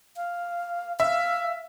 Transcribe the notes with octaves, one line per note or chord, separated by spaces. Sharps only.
F5
E5 F5